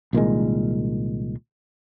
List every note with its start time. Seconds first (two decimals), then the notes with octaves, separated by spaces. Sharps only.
0.13 C2 A#2 D#3 G#3